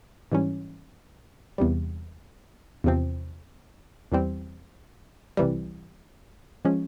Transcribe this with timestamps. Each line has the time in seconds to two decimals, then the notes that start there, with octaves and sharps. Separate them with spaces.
0.32 G#2 E3 G3 C#4
1.58 E2 C3 G3
2.84 E2 C3 F3 C4
4.12 E2 E3 G3 C4
5.37 C2 C3 E3 G3
6.65 F3 G#3 C#4